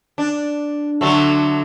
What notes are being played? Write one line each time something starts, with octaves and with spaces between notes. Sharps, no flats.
D4
D3 F#3 A3